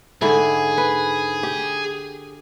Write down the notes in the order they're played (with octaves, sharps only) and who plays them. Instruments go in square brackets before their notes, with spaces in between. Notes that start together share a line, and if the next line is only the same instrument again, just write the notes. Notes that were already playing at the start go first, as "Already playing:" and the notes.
[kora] G#2 D3 E4 [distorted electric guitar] G#4
[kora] B4
G4